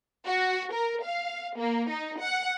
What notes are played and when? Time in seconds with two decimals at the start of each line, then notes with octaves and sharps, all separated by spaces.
0.25 F#4
0.73 A#4
1.04 F5
1.57 A#3
1.89 D#4
2.20 F#5